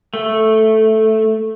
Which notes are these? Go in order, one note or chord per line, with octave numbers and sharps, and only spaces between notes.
A3